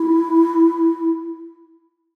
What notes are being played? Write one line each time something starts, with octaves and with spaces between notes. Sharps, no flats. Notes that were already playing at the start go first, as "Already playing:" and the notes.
Already playing: E4